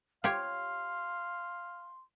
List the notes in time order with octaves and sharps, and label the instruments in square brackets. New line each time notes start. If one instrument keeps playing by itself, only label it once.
[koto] F4 G4 C#5 [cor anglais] F5 [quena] C6